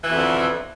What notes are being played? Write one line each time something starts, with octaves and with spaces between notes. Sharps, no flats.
F2 B2 D3 E3